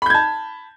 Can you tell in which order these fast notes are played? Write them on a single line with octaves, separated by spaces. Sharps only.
B5 G6 G#6 A5